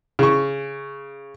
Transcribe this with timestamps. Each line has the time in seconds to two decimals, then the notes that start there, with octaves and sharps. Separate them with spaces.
0.19 C#3 C#6